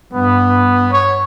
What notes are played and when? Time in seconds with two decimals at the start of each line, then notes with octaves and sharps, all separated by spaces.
0.13 G2 B3
0.90 C#5